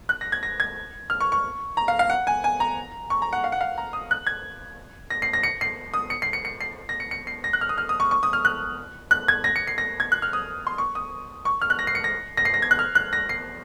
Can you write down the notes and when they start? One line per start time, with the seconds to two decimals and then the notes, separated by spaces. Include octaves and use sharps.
0.09 F#6
0.21 A#6
0.32 G#6
0.43 A#6
0.60 G#6
1.10 F6
1.21 C#6
1.32 C#6
1.77 A#5
1.88 F5
1.99 F5
2.10 F#5
2.27 G#5
2.44 G#5
2.60 A#5
3.10 C#6
3.22 A#5
3.33 F#5
3.44 F5
3.52 F#5
3.61 F5
3.78 A#5
3.93 D#6
4.11 F#6
4.27 G#6
5.10 A#6
5.22 C7
5.33 A#6
5.43 C#7
5.61 C7
5.94 D#6
6.10 C#7
6.22 C7
6.33 C#7
6.45 C#7
6.61 C7
6.89 A#6
7.00 C#7
7.11 C#7
7.27 C7
7.44 A#6
7.53 F#6
7.61 F6
7.69 D#6
7.78 F6
7.89 D#6
8.00 C#6
8.11 C#6
8.23 D#6
8.33 F6
8.45 F#6
9.11 F#6
9.28 G#6
9.44 A#6
9.56 C#7
9.67 C7
9.78 A#6
10.00 G#6
10.12 F#6
10.22 F6
10.33 D#6
10.67 C6
10.78 C#6
10.95 D#6
11.45 C#6
11.62 F6
11.70 F#6
11.79 A#6
11.87 C7
11.95 C#7
12.04 A#6
12.37 A#6
12.45 C7
12.54 A#6
12.62 G#6
12.71 F#6
12.79 F6
12.95 F#6
13.13 A#6
13.29 C7